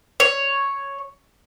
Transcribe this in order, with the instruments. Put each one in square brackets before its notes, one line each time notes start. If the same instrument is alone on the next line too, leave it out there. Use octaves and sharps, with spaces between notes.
[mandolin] C#5